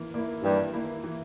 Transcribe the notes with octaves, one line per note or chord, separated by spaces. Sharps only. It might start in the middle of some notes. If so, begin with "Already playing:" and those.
Already playing: E3 A#3 E4
A#3 E4
G2 E3
A#3 E4
E3